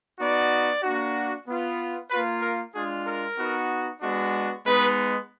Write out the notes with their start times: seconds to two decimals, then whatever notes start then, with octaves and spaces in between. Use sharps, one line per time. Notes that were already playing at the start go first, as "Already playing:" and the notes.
0.20 B3 D#4 F#4 D5
0.83 A#3 D4 F#4
1.46 B3 F4
2.10 A#3 F4 B4
2.42 A#4
2.74 G#3 D4 F4 G#4
3.06 A#4
3.37 B3 D#4 F#4
4.01 G#3 B3 D4 F#4
4.65 G#3 B3 D#4 B4